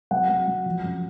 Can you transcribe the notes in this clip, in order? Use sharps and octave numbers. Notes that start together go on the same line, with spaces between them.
F#3 F#5
F#3
F#3
F3
F#2